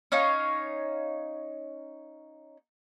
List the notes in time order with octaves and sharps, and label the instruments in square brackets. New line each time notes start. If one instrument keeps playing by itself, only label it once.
[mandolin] C#4 D#4 C#5 F5